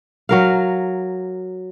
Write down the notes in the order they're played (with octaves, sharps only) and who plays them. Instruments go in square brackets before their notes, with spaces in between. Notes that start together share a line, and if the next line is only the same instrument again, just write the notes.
[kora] F#3 A#4 F5